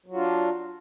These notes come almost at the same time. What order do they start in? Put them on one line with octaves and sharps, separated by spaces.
F#3 F#4 F4 D4